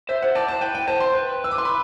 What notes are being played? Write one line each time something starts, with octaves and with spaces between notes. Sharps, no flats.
C5 E5
C5 F#5
D5 A5
C5 A5
B4 G5
G5
C5 A5
C6
B4
E6
D6
C6
B5